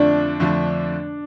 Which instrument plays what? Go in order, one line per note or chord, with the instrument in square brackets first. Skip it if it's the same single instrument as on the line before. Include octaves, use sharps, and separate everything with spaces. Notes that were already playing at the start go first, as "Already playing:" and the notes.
Already playing: [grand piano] F2 D3 F3 A3 [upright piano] D4
[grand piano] F2 D3 F3 A3